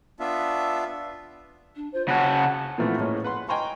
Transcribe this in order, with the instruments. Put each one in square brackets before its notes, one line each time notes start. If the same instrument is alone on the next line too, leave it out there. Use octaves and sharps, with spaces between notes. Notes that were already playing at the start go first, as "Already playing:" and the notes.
[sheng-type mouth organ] B3 D4 F4 E5
[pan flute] D4
[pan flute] F4 [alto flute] C5
[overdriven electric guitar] C#3 F#4 [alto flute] F#5 [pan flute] A5
[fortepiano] A#2 E3 F3 A3 B3 C4
A2 G#3 A#3 C#4
B4 F#5 C6
D#5 G5 G#5 A#5 C6 C#6